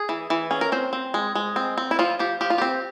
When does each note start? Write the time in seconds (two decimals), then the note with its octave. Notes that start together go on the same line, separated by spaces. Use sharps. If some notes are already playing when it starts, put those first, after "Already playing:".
Already playing: G#4
0.09 E3
0.30 E3
0.51 C#4 G#4
0.61 A#4
0.72 C4 C5
0.93 C4
1.14 G#3
1.35 G#3
1.56 C4
1.78 C4
1.91 E4
1.99 F3 F4
2.19 F3 G4
2.41 F3 G4
2.50 F4
2.58 C4 G4